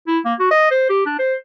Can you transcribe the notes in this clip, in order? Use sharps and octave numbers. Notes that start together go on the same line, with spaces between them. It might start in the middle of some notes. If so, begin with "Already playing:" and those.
E4
A#3
F#4
D#5
C5
G4
D4
C5